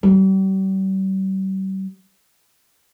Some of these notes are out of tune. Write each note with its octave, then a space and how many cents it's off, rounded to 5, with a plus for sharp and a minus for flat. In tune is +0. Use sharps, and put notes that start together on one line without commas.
G3 -40